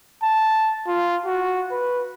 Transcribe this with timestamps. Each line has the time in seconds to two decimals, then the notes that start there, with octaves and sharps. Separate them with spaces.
0.23 A5
0.87 F4
1.26 F#4
1.71 B4